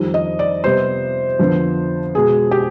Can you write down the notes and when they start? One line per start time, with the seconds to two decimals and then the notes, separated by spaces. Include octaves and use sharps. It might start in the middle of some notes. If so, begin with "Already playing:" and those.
Already playing: F2 D#3 G3
0.14 D#5
0.39 D5
0.64 C3 G3 B3 C5
1.39 F2 D3 F3 B3
2.15 B2 G#3 B3 G#4
2.51 G4